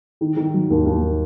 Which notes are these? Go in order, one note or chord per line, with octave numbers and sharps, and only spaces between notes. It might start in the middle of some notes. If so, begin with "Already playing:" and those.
D#3
D#3
F#3
D#2
D#2